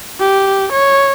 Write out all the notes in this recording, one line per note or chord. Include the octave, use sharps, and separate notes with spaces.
G4
C#5